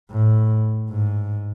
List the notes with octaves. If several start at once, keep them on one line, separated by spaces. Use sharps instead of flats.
A2
G#2